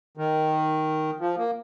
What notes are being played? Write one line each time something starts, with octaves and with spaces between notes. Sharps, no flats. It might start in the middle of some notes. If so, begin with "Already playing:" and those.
D#3
F3
A#3